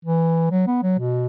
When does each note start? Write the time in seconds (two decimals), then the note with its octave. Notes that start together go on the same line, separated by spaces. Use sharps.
0.05 E3
0.51 F#3
0.67 B3
0.83 F#3
0.99 B2